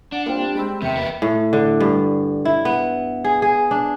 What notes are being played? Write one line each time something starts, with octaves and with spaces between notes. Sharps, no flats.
D4 F#5
G3 A#3 C4 F4
G#3 C4 B5 E6
E2 C3 D#3 E5 C#7
A#3 B4
A2
D3
G2
E4
B3
G#4
G#4
D4